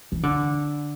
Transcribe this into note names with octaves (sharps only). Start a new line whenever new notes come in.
E3
D3